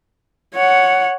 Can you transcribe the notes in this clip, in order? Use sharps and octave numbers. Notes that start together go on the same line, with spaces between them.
C#5 F#5